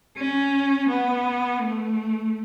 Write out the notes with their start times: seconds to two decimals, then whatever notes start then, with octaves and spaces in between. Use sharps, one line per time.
0.17 C#4
0.89 B3
1.61 A3